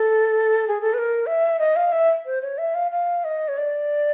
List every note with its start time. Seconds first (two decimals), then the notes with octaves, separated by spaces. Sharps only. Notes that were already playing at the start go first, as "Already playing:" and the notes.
Already playing: A4
0.68 G#4
0.81 A4
0.94 B4
0.98 A#4
1.26 E5
1.59 D#5
1.76 F5
1.92 E5
2.26 C5
2.42 C#5
2.58 E5
2.75 F5
2.91 F5
3.24 D#5
3.48 C#5
3.58 D5